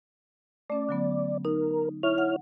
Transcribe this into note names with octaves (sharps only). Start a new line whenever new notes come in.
A3 C#4 D5
D3 F#3 B3
D#4 A#4
E4 C#5 F6
F#5